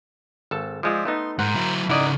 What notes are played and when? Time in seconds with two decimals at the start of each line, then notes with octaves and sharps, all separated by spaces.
0.51 G#1 A4 A5
0.83 F3 G#3 F4 C5 D5 E5
1.05 A3 B3 D#4 C6
1.39 G#2 A#4 C5 F#5
1.55 F#3 E4
1.89 C#3 D#4 E4 A#4 D5 D#5 F#5